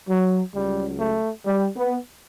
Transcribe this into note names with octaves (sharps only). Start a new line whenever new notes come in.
F#3
C#2 C#3 F#3 G3
A3
G3
B3